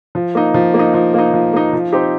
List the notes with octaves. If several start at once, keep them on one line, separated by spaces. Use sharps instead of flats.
F3
A#3 D#4
F3
A#3
D#4
F3
A#3 D#4
F3
A#3 D#4
F3
C4 D#4 G4